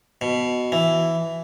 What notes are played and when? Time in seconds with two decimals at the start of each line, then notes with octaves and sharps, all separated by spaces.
0.21 B2
0.72 E3